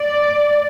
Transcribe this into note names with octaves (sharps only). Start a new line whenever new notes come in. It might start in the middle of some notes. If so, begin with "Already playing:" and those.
Already playing: D5